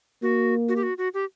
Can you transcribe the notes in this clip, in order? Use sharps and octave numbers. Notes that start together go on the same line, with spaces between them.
A#3 F#4
F#4
G4
F#4
F#4
G4